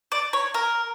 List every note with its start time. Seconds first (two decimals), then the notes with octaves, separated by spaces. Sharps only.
0.12 D5
0.33 C#5
0.54 A#4